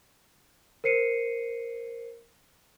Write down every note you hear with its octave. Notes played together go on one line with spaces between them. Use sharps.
A#4 C5 C7 C#7 D#7